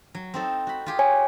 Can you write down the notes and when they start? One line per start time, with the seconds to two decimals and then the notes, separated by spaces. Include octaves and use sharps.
0.15 F#3
0.34 C4 D#4 A4
0.67 F#4 B5
0.86 F4 G4 G#4
0.99 C#5 G#5